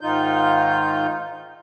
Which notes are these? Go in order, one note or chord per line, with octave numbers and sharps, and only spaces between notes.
G#2 D#3 D#4 F4 G6